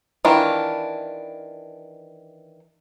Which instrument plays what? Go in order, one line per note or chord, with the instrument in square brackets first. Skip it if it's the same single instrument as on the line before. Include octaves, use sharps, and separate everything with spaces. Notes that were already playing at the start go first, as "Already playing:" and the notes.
[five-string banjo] D#3 E3 D4 F4